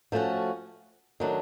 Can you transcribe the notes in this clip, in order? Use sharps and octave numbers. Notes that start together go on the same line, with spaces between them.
F3 A3 C#4 F#4
D#3 F#3 A3 D4